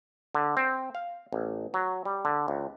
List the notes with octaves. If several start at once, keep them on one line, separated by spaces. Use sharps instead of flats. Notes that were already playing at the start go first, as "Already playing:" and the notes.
D3
C4
F5
A1
F#3
G3
D3
C#2